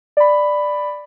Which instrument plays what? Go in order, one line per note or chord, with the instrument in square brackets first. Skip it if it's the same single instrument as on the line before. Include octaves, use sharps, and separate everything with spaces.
[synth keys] D5 B5